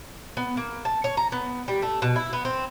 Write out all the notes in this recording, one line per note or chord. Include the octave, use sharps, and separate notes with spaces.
B3
A#3
A5
C#5
A#5
B3
G3
A3
B2
E4
B3
C4